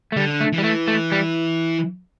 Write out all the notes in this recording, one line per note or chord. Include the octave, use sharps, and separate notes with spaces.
A3
D3 G3
A3
E3
G3
A3
A3
G3